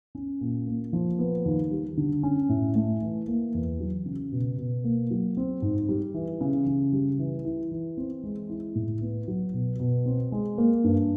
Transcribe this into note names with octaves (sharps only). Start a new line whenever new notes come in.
C#4
A#2
A#3
F3
B3
D#2
G3
D3
C#4
A2
A3
E3
A#3
E2
F#3
C#3
B2
B2
A#3
F#3
C4
G#2
G3
E3
C#3
C#3
G3
E3
E4
E3
C4
G#3
E4
A2
B3
F#3
B2
B2
C4
G#3
A#3
G2